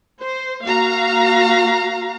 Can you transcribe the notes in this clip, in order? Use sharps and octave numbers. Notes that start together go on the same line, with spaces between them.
C5
A#3 F#4 F5 A#5